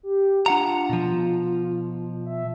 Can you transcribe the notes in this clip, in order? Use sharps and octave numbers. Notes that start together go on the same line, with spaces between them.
G4
D4 F4 F#5 A#5
B2 F3
E5